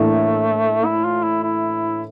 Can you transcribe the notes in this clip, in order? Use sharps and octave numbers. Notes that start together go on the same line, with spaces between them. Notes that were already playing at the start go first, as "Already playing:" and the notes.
Already playing: A2 E3 A3 A#3 D4 A4
E4
F4
E4
E4